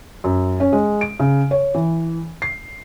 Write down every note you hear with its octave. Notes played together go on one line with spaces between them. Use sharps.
F#2
C#4
G#3
D7
C#3
C#5
E3
C7